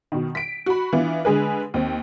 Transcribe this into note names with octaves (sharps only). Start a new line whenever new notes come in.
B2 D#3
B6 D7
F#4 B5
E3 B3 D4 F4
D3 G#3 G#4 B4
D#2 C4